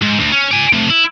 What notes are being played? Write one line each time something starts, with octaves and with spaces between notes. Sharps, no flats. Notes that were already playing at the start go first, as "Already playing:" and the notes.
G#2
D2
C#4
D5 G#5
C3 A3
E4